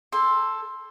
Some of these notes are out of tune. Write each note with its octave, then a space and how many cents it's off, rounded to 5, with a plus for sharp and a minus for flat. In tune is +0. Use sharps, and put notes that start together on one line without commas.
A4 +0 G5 +45 C6 +10